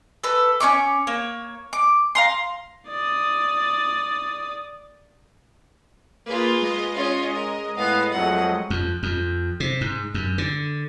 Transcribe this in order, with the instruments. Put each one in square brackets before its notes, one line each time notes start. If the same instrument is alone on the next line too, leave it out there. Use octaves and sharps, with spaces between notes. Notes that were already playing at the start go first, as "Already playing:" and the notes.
[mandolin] A4 B4
C#4 D#4 C#6 D6
A#3 C#5
D6
F5 A#5 C6
[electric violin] D5 D#6
[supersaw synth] A#3 G#4 [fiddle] F4 B4
[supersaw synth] G#3 D#5
[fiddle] C#4 F4
A#4
[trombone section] A2 B3 [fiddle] F5
[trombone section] F2 F#3 A3 [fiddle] F#5
[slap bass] F2
F2
C3
G#2
F#2
D3